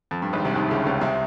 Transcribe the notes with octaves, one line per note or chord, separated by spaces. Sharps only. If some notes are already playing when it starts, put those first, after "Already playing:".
F2
G2
G#1 G#2
C2 C3
D#2 D#3
C#2 C#3
C#2 C#3
C2 C3